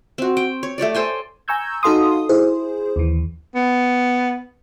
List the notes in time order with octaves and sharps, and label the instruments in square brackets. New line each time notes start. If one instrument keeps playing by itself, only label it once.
[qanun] C4 F#4
G5
C#5
A3 G4 C#5 D5
A4 C5 G5 G#5
[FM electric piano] G#5 A#5 C#6 E6 G6 G#6
D#4 F#4 A4 F5 C6 D#6
E4 G#4 C5
D#2 E3
[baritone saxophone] B3